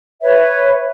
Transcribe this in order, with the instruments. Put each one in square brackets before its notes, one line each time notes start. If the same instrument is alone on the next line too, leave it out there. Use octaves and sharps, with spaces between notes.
[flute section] B4 C#5 E5